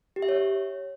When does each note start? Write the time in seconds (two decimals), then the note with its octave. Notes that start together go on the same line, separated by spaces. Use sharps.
0.16 G4
0.22 E5
0.29 C#5